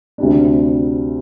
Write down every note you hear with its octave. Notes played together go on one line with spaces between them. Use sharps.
D2 C3 G3 D4